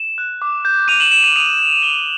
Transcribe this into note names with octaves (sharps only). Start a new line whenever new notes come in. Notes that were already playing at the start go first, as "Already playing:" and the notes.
Already playing: E7
F#6
D6
G6
D6 D#7 F7
E7 F#7
G6 E7 F#7
D#7 F7
D#6 D#7 F7
G6
D#6 F7 G7